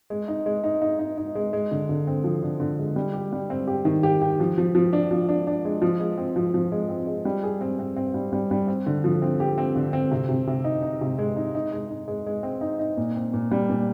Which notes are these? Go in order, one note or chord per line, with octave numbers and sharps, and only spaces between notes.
G#3
D#4
G#3
D#4
D#4
D#4
D#4
G#3
G#3
D3
D3
C4
F3
D3
D3
G#3
G3
G4
G3
C4
G4
D#3
G4
G4
F3
F3
F3
D4
F3
D4
D4
G#3
F3
G#3
C4
F3
F3
G#3
C4
G#3
G3
G#4
C4
C4
C4
G3
G3
G3
C4
D3
F3
C4
G4
C4
D3
C4
C3
C3
C3
D#4
D#4
C3
G#3
D#4
D#4
G#3
D#4
G#3
G#3
C4
D#4
D#4
A#2
C4
A#2
G3
A#2